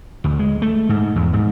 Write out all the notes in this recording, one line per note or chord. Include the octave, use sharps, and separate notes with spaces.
D2
G#3
A3
G#2
E2
G#2